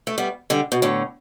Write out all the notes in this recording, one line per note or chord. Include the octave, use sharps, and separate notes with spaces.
A3
G3 B3
D3 G3
B2
A2 D3